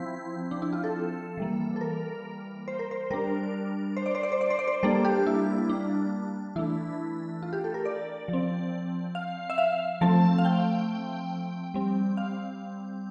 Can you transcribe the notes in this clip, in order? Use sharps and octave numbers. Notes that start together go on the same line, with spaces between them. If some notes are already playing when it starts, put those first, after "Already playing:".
Already playing: F3 C4 E4
D4
E4
F4
A4
E3 G3 A#3
A4
A#4
C5
A#4
C5
G3 D4 A#4
C5
D5
C5
D5
C5
D5
C5
D5
C5
G3 A#3 D4 A4
G4
E4
D4
E3 A3 D4 E4
F4
G4
A4
A#4
D5
F3
C4
F5
E5
F5
F3 A3 C4 A5
F5
G5
G3 C4
F5